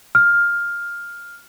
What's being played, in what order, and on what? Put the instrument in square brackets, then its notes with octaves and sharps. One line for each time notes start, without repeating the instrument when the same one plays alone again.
[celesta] F6